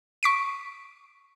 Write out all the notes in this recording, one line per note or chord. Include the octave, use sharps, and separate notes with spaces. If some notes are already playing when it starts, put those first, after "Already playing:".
C#6 B6 D7